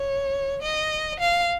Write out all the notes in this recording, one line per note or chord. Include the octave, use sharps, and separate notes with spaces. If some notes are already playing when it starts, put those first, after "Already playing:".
Already playing: C#5
D#5
F5